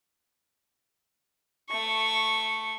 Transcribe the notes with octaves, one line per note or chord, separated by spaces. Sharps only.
A3 C#6